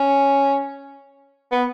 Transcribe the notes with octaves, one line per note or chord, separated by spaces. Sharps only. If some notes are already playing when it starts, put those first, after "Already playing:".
Already playing: C#4
B3